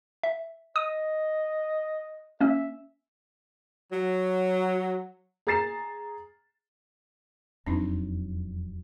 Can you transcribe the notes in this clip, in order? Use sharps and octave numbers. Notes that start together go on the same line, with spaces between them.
E5
D#5 D#6 D#7
A#3 C#4 E5
F#3
G#4 A#5 A6 C7 E7
E1 F2 F#3 C4 D4 D#4